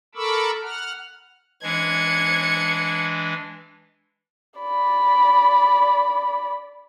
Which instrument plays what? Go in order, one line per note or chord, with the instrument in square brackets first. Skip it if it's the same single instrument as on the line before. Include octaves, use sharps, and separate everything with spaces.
[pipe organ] A4 A#4 B5 C#6 D6 E6
F#5 F6
[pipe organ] E3 G#3 D4 [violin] G#6 C#7
[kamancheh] D5 B5